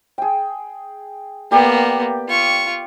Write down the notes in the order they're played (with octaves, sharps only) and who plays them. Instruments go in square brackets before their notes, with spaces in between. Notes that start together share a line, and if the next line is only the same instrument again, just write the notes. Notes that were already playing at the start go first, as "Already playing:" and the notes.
[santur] G#4 G5
[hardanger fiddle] A#3 B3 [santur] G4 D5 G5
[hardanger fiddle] F4 C#6